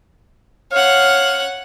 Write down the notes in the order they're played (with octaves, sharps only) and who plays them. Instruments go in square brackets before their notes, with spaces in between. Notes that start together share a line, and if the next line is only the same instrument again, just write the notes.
[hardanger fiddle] C#5 F#5 [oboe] F5